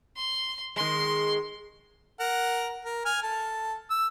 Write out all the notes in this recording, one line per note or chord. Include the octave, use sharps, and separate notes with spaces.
C6
D#3 G#3 C6
A#4 F#5
A#4
G#5 F6
A4
E6